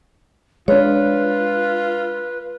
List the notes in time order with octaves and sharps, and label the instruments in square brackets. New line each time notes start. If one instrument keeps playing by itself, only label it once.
[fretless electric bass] G#3 D4 [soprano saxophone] F4 [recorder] B4 [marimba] C#5